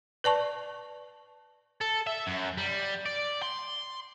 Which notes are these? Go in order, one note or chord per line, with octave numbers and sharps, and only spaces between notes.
B4 D5 A5 C#6
A4
E5
F#2
G3
D5
C6